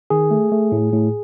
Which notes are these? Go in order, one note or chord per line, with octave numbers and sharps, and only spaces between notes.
D#3 G#4
A3
A3
A2
A2